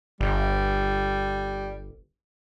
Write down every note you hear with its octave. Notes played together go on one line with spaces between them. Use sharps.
G1 G3